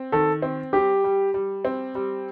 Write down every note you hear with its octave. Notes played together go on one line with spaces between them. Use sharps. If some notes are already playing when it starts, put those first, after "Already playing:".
Already playing: C4
D#3 A4
C4
G3 G4
G3
G3
C4
G3